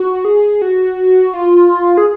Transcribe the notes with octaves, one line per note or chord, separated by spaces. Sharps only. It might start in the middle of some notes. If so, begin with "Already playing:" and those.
Already playing: F#4
G#4
F#4
F4
G#4